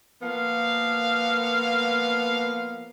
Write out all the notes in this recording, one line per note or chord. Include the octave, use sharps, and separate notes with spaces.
F3 A#3 B3 F5